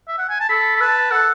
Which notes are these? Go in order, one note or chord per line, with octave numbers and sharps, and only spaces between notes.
E5
F#5
G#5
A5
A4 B5
B5
B4 A5
A4 F#5